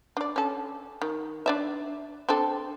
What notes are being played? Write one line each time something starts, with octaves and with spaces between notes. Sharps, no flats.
D4 D5
C#4 A4
D#3
D4 D5 E5
C4 D4 A4